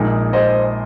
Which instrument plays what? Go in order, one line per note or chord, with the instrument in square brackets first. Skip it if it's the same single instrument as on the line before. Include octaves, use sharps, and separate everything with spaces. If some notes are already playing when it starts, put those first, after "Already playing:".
Already playing: [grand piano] A#1 A#2 G#3 D#4
[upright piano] C5 D#5